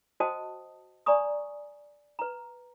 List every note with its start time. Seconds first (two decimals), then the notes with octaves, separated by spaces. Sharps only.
0.20 F#4 C5 D#5 G5 A5 D#6
1.06 D5 G#5 A#5 C#6 D#6
2.19 B4 A#5